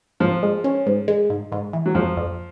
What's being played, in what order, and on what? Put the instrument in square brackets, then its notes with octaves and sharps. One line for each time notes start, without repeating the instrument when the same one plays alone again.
[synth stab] G#2 [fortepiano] F3
[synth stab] G#3
C#4
G#2
G#3
G#2
G#2
E3
[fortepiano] F#3
[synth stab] F2 [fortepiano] F3
[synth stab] F2